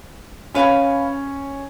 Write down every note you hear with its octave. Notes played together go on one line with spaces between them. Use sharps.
C#4 B4 F5 G#5 B5